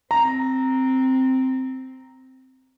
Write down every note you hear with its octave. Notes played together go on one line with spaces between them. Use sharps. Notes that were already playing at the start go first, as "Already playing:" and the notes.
C4 A#5